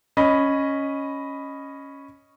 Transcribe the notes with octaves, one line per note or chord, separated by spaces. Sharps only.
C#4 D#5 B5